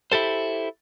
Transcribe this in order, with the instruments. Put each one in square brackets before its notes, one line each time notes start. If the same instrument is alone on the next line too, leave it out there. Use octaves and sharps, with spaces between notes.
[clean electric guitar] E4 G4 A4 C5